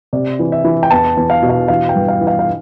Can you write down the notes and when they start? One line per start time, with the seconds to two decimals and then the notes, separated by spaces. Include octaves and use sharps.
0.13 C3 D5
0.39 E3
0.52 E5
0.64 E3
0.83 G5
0.90 E2 A5
1.17 E2
1.30 F5
1.42 B2
1.49 F5
1.68 E3 F5
1.89 G5
1.96 G2
2.08 F5
2.21 E3
2.27 F5
2.39 F5